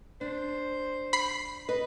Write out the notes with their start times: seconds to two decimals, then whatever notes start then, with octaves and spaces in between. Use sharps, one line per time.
0.21 D4 C5
1.13 B5 C7
1.69 B4 D#5